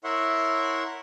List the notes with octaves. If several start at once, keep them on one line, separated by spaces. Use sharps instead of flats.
E4 A#4 C#5 E5 F#5 C6